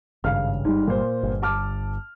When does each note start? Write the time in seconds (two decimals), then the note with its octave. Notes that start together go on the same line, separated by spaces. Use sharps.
0.24 G#1 G2 C#3 F5 F6
0.65 G1 G#2 G3
0.87 A#2 C5
1.23 G1
1.42 A5 D6 F6